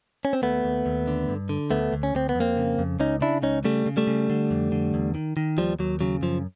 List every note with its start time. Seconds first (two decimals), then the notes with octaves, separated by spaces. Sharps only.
0.25 C#4
0.33 C4
0.42 D#2 A3 B3
0.64 D#2
0.86 D#2
1.07 D3
1.28 G2
1.49 D3
1.71 D2 A3 B3
1.93 D2
2.03 C#4
2.15 D2 C4
2.29 B3
2.35 F2
2.40 A#3 C4
2.57 C#3
2.79 F2
3.00 C#2 C#4 D#4
3.21 C#3 D4 E4
3.42 C#2 C#4 D#4
3.65 C#3 G3 A3
3.86 C#3
3.97 G3 A3
4.07 C#3
4.30 D3
4.51 F2
4.72 D3
4.94 E2
5.15 D#3
5.37 D#3
5.58 D#2 F3 G3
5.79 D#2 F#3
6.01 C#3 F#3
6.22 F#2 F3